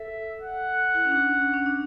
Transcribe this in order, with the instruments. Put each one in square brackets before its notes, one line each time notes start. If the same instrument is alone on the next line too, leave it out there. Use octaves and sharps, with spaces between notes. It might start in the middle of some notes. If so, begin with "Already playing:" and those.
Already playing: [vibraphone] A4 [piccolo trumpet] E5
[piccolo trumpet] F#5
[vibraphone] E4
C#4
D4
C#4
D4
C#4
D4